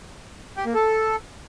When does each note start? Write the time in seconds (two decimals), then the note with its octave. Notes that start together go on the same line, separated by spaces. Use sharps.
0.57 G4
0.66 A#3
0.74 A4